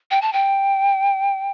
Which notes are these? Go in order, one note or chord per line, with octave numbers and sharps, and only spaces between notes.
G5
A5
G5